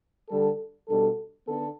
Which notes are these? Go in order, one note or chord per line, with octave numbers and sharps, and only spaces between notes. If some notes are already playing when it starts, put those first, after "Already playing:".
D3 G3 D4 A4
B2 G3 D4 A4
D3 B3 D4 A4